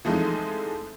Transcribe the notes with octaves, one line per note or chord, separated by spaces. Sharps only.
E3 F3 G#3 A3 C4 D#4